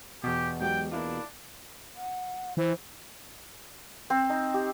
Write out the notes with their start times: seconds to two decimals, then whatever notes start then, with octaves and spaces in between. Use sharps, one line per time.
0.23 E2 B2 G4
0.61 G#2 F#3 G4 G5
0.92 A#3 D4 E4 F4
1.96 F#5
2.57 E3 C5
4.10 C4
4.30 D#4
4.54 G4